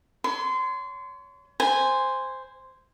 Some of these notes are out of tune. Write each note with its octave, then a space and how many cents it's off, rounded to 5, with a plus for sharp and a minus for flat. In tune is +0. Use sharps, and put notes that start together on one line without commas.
C#5 +25 C6 -25
C5 -5 G#5 -15